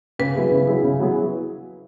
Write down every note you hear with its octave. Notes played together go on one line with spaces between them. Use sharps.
C#3 B4
F#3 B3 E4 G#4
C#3
F#3 B3 E4 G#4
C#3
F#3 B3 E4 G#4